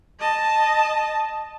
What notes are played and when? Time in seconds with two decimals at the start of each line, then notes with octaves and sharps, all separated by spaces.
0.20 D#5 A5